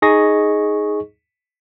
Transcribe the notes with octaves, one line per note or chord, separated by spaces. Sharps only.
D#4 G#4 D#5 C#6 A#6